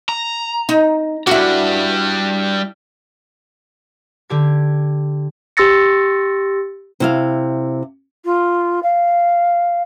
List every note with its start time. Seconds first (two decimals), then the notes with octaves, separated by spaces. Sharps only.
0.09 A#5
0.69 D#4
1.27 G3 D4 E4 F#4
4.30 D3 G4 G#6
5.57 G4 C6 E6 A6 A#6 C#7
7.00 C3 E4 F5
8.25 F4
8.83 F5